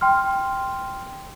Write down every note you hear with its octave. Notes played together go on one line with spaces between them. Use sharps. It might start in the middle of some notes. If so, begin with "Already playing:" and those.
G5 C6 F6